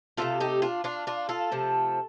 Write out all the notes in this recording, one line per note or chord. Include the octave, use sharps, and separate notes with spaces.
C3 D#3 A3 F4 A4
D#4 G4
D4 F4
D4 F4
D4 F4
F4 A4
C3 F3 A3